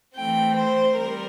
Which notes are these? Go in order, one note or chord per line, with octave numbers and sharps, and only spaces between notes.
E3 A3 C4 G5
C5
G3 C4 A#4